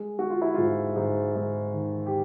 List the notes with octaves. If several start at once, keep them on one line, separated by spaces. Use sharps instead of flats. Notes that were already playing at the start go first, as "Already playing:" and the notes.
Already playing: G#3
G#3 F#4
F4
E4
G#2 F4
G#2
G#2
D#3
G4